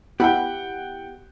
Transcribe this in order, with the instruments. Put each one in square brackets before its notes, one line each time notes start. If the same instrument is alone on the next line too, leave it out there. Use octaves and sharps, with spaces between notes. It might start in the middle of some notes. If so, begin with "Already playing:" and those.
[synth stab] B3 E4 [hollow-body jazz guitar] G4 B5 [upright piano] F#5 G5